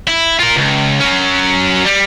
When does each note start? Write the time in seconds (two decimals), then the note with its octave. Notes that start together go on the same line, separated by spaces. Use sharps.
0.07 E4
0.39 F4 A#4
0.56 C#2
1.00 F#3 C#4
1.86 G3